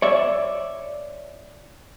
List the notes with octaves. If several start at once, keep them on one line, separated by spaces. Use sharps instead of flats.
C#5 D5 E5